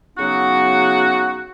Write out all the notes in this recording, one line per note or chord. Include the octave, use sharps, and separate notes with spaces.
C#3 F#3 B3 D#4 F#4